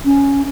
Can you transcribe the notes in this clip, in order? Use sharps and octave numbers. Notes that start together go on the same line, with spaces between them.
C#4